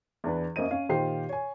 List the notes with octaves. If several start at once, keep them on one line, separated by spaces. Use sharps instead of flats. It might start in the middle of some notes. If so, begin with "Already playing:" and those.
E2 D4 B4
F#2 A#3 C4 D#5 D#7
C#4 F5
A#2 D#3 F4 G4 C5 C7
C#5 G#5